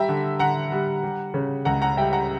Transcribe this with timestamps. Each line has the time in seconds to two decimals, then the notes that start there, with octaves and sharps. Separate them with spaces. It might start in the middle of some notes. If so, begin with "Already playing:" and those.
Already playing: G3 E5 G5 A#5
0.09 D3
0.39 D3 F#5 A#5
0.72 G3
1.03 G3
1.34 C#3
1.65 C#2 F#5 A#5
1.82 F#5 A#5
1.97 G3 E5 G5
2.13 F#5 A#5